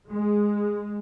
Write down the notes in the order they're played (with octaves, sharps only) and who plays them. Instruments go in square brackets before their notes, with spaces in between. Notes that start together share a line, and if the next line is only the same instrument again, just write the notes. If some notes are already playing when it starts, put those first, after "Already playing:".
[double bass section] G#3